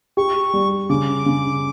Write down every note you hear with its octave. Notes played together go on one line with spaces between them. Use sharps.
G4 C#6
G3
C#3 D6
C#3